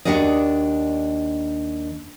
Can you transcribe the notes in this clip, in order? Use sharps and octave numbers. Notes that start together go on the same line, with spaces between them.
D#2 G#2 D4 F#4 D5 D#5